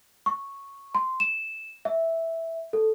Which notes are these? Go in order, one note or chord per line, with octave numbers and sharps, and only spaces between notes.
C#6
C6
E7
E5
A4